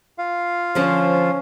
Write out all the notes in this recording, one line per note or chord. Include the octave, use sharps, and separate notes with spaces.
F4 F5
D3 F3 C#4 C5